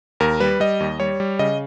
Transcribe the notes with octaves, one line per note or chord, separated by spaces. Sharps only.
D#2 A#4
G3 B4
G3 D#5
D#2
G3 C#5
G3
C#3 D#5